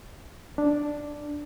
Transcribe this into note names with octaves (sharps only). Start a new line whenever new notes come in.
D4